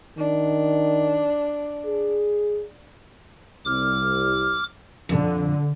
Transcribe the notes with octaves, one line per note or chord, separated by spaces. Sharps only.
D#3 D4
G#4
C2 D6 F6
F2 D3